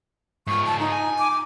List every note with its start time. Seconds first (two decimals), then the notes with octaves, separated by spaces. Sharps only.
0.47 G#2 F4 C#6
0.66 A5
0.79 D#4
0.92 G#5
1.19 D6